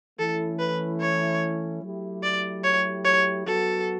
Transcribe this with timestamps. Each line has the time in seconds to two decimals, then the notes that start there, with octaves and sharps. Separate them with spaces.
0.19 E3 A3 C#4 E4 A4
0.59 B4
1.01 C#5
1.83 F#3 A3 E4 G4
2.24 D5
2.64 C#5
3.05 C#5
3.46 F#3 B3 F#4 A4